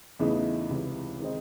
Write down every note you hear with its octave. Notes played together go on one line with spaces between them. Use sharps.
E2 C#3 E3 A3 D#4
C#2 C3 E3
D#3 G#3 C4 D#4